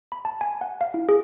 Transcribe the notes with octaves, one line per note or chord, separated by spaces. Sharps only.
B5
A5
G#5
F#5
F5
E4
G#4